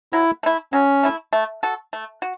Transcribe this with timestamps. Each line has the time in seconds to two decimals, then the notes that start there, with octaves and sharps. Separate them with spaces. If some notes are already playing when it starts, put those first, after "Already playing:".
0.13 F#3 E4
0.43 A3 E4
0.73 F#3 C#4
1.03 A3 E4
1.33 A3
1.63 F#4 A4
1.93 A3
2.22 F#4